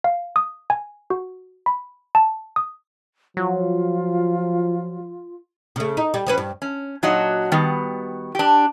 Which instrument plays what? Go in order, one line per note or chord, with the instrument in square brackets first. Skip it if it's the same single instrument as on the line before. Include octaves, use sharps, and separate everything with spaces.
[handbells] F5
D#6
G#5
F#4
B5
A5
D#6
[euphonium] F3 [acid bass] F#3 [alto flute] F4
[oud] C#3 A3
D#4
G3
F3 C#4 B4
G2
[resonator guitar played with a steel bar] C#4
A#2 F#3 D4 D#4 F#4 D#5
D#3 G3 B3 F#4
D4 G4